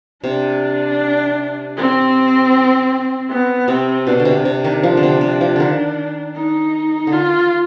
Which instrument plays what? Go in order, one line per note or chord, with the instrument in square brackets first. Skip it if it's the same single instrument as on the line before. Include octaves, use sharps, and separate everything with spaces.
[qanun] C3 [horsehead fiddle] D4
[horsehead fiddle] C4
B3
[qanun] C3 [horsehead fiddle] C4
[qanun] B2 [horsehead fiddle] D4
[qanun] D3
C3
C3
D#3
F3
D3
C3
C3
F3
D3 D#3
[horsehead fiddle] D#4
[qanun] D3
[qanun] D#3 [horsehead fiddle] F4